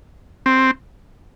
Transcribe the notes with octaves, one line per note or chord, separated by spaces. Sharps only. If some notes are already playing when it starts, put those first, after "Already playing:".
C4